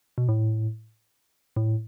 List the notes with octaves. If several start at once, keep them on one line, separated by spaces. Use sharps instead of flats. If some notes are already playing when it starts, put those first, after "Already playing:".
B2
A2
A2